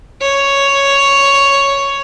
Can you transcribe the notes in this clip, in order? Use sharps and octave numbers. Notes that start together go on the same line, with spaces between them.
C#5